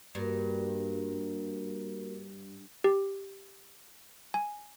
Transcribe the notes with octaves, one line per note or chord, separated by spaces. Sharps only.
G2 A#3 F#4 A#4
G4
G#5